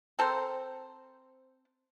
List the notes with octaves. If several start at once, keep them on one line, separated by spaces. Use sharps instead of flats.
C4 A4 A#4 C5